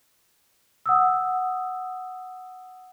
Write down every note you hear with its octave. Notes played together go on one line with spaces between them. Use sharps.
F#5 D#6 E6